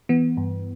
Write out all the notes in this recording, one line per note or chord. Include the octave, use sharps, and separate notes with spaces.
E3 B3
G2